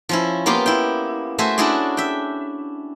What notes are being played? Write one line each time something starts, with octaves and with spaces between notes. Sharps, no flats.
F3 C#4 E4
A#3 B3 F4 G4 A#4
E4 G5
A3 F#4 C5 E5 G#5
C#4 D4 E4 F#4 G#4 D5
E5 G5